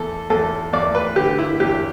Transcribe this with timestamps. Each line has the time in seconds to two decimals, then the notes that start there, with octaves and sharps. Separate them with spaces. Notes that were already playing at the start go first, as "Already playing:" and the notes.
Already playing: E2 A4
0.30 E2 A4
0.73 E2 D5
0.95 B4
1.16 D3 G4
1.39 E4
1.60 E2 G4